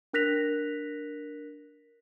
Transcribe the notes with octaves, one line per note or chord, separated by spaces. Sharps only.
D4 A#4 F#6 A#6 B6 F7